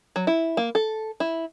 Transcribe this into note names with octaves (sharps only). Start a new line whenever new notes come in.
F#3
E4
A#3
A4
E4